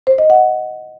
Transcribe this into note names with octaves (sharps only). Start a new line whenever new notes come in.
C5
D#5
F#5